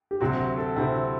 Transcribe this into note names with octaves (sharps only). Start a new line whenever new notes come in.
G4
D2 C3 F#3 C4 F#4
F#4
A4
D2 C3 F#3 C4 E4